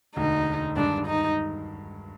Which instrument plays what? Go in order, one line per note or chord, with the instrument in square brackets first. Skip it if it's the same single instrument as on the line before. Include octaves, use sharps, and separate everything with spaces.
[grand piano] E1 D2 D3 [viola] D#4
[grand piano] G2 D#3 G#3 [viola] D4
[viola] D#4